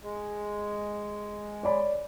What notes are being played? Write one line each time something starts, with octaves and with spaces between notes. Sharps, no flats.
G#3
C#5 D5 B5